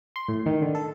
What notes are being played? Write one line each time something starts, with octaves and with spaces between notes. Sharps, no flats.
C6
A2
D#3
D3
A4